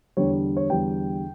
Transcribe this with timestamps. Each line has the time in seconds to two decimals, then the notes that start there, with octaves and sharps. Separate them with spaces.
0.17 E2 D3 G3 C#5
0.57 C#5
0.70 E2 D3 G3 G5